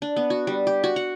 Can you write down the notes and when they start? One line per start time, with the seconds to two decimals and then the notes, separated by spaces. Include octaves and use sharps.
0.02 D4
0.16 B3
0.30 F#4
0.47 G3
0.67 G4
0.84 F#4
0.96 F#5